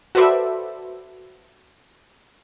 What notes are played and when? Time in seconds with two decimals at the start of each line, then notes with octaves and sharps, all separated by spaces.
0.15 F#4 A4 B4 C5 D5 E5